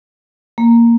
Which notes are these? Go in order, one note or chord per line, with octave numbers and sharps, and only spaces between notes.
A#3